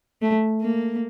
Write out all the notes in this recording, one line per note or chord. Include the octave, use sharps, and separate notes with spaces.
A3
A#3